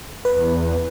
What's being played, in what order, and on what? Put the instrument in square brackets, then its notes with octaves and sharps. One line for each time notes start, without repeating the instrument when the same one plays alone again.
[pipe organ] E2 [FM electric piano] B4